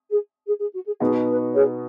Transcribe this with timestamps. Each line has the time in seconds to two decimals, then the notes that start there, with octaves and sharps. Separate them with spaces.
0.10 G#4
0.47 G#4
0.60 G#4
0.74 F#4
0.87 G#4
1.00 B2 B3 D#4 F#4 G#4
1.27 B4
1.54 G#4 C#5